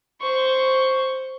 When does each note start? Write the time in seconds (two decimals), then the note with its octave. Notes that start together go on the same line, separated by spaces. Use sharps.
0.22 C5 C#6